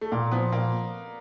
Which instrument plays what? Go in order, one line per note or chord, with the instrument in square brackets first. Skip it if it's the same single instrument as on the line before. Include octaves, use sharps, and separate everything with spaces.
[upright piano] A3
[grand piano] A#2 [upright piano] A#3
[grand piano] F3 [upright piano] B3
[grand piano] A#2 [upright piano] A#3